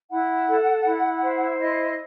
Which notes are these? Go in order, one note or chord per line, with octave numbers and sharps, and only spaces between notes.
E4 F#5
A4
E4
C5
E4 D#5